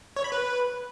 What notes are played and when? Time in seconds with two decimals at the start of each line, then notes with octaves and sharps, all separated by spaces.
0.17 C#5
0.24 B5
0.32 B4